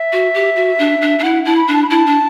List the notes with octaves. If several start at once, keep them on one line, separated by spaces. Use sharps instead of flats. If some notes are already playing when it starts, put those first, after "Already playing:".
Already playing: E5
F#4
G4
F#4
D4
D4
D4
E4 F#5
E4 A5
B5
D4
A5
B5
E4 A5
D4